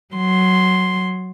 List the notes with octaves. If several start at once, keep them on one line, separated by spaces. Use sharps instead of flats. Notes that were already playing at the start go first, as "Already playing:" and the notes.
F#3 C6